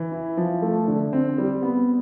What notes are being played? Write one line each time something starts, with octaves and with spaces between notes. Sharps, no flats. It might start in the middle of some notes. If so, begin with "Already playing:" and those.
Already playing: E3
E4
F3
A3
D3
C4
G3
B3